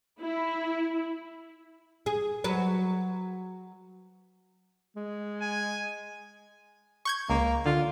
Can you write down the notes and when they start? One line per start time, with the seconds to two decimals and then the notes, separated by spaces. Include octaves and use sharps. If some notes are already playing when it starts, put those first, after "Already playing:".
0.20 E4
2.06 G#4
2.44 F#3 B4
4.96 G#3
5.41 G#5
7.05 C#6 G6 G#6
7.30 C#2 A#3
7.66 D3 F4